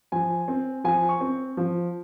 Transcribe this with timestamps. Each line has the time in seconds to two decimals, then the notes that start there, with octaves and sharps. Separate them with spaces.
0.12 F3 G#5
0.48 C4
0.84 F3 G#5
1.09 C#6
1.21 C4
1.57 F3